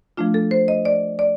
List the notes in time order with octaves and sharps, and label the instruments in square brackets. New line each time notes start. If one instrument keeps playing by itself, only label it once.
[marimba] F3 A3 D4 F4
A4
C5
D#5
D5
D5